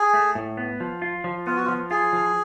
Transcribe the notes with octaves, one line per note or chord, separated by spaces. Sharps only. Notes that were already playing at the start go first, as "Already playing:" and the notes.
Already playing: G#4
A3
A2
B3
F3
F4
F3
B3 F4
F#4
F4
F3
F4 G#4
F3